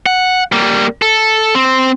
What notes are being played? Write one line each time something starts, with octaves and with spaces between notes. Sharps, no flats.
F#5
G3 A#3
A4
C4